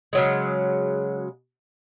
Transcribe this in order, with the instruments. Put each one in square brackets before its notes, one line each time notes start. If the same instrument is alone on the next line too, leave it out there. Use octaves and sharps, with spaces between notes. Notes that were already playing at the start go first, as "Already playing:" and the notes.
[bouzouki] C#3 F#3 G#3